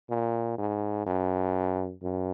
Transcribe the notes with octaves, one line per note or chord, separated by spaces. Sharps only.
A#2
G#2
F#2
F#2